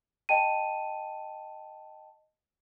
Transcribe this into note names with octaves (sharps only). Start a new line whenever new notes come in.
D#5 G5 A5 D#7